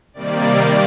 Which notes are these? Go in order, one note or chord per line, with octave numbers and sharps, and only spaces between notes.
C3 D#3 G3 A#3 D5